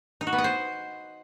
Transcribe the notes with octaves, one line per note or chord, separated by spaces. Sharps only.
D#4
F#4
B3
D#5
C5